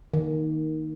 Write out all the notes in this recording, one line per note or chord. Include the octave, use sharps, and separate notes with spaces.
D#3